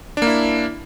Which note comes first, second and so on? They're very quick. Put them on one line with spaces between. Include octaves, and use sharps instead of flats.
D4 A#3 E4